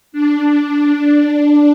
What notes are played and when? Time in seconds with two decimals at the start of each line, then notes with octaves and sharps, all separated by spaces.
0.12 D4
0.69 D4